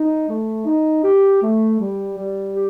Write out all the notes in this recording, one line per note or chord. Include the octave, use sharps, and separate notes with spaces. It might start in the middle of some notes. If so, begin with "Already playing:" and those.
Already playing: D#4
A3
D#4
G4
A3
G3
G3
G4